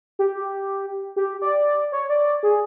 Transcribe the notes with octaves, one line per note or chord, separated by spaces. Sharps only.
G4
G4
D5
C#5
D5
G#4